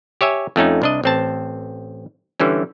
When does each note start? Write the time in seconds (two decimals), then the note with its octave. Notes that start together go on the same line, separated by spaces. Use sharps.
0.21 G4 C#5 E5 G#5
0.56 F2 A3 C#4 D#4
0.82 C2 D4 D#5
1.04 A1 C4 A5
2.40 D3 E3 G3 C#4